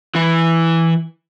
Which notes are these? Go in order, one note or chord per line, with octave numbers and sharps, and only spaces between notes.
E3 E4